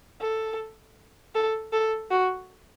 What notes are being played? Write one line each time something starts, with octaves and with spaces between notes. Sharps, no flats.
A4
A4
A4
F#4